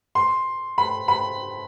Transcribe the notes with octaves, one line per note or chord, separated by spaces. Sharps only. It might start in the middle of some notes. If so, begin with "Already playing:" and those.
C6
B5
B5